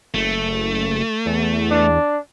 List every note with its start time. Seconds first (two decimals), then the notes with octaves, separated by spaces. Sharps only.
0.14 F#1 A3
1.26 E2
1.71 D4